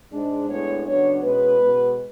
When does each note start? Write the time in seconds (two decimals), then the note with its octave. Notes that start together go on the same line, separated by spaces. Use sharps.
0.11 G#2 G#3 D4
0.48 A2 G#3 B3 D4 C#5
0.85 C#3 F#3 B3 D4 C#5
1.22 B2 G#3 C#4 B4
1.59 B2 G#3 B3